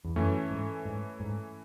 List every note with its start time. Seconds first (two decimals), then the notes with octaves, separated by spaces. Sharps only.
0.05 E2
0.16 F#2 E3 A3 C#4
0.50 G#2
0.85 G#2
1.20 G#2